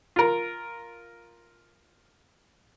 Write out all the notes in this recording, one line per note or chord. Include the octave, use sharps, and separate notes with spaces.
F4 A#4